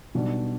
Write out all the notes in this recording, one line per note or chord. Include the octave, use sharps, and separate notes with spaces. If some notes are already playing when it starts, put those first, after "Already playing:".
B1 B2 G3 D4